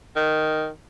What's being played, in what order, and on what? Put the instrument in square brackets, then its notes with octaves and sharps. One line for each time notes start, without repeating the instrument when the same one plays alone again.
[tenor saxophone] D#3